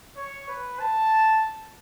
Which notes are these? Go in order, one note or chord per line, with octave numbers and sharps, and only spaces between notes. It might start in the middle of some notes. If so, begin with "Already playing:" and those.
C#5
B4
A5